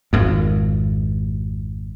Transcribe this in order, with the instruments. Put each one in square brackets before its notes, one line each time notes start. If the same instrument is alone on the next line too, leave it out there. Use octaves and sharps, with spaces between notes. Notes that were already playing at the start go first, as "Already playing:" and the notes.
[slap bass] G#1 F2